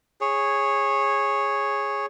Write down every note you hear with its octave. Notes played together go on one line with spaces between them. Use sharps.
G#4 C#5